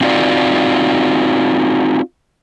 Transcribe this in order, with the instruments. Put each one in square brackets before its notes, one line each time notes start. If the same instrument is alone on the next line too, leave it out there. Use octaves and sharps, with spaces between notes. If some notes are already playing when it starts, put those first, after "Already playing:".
[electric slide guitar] C4 D#4 F4 F#4 D5